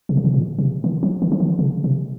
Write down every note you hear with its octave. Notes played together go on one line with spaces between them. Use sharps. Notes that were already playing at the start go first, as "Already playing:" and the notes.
C3
C#3
C3
A#2
C3
D#3
F3
D#3
F3
D#3
C#3
C3